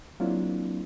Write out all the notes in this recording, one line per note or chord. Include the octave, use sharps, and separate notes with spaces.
F#3 A#3 C4 D4 E4 F4